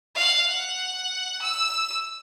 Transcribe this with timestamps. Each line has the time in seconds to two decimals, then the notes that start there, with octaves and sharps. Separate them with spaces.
0.15 F5 F#5
0.49 F#5
1.42 E6